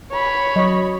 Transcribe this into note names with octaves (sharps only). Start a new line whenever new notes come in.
C#5 B5
F#3 D#5